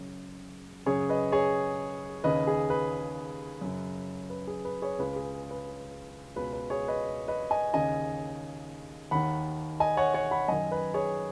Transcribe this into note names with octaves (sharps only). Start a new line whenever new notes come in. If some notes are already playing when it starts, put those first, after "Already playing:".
Already playing: F#2 C#3
F#2 C#3 G#4 C#5
B4 D#5
G#4 C#5
D#2 C#3 B4 D#5
G#4
B4
F#2 C#3
B4
G#4
B4
G#4 C#5
C#2 C#3 B4
G#4
B4
C#2 B2 B4
B4
G#4 C#5
B4 D#5
B4 D#5
D#5 G#5
D#2 C#3 D#5 G#5
D#2 D#3 F#5 B5
D#5 G#5
C#5 F#5
C#5 F#5
F#5 B5
F#2 D#3 D#5 G#5
B4 D#5
G#4 C#5